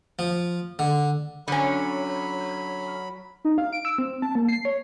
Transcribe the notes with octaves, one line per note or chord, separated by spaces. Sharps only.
F3
D3
D3 F#3 C#4 B5
D#4
F5
D7
E6
C4
A5
A#3
C7
C#5